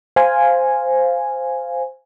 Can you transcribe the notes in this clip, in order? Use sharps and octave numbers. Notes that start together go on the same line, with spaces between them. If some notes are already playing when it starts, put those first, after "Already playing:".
C5 F5 G#5